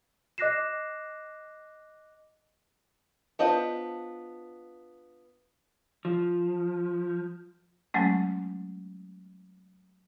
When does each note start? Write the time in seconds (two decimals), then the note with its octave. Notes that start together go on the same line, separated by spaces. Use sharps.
0.38 D#5 D6 F#6 A#6 C7 E7
3.39 B3 D4 F4 C5 D#5
6.05 F3
7.94 F#3 G#3 A3 C#4